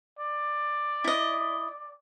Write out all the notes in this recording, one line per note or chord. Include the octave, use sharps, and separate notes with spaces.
D5
E4 D#5